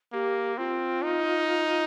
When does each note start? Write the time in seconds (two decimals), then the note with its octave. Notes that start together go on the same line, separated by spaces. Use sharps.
0.12 A#3 G4
0.58 C4 F4
1.02 D#4